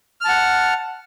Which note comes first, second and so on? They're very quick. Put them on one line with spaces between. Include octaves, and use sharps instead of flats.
F6 A5 F#5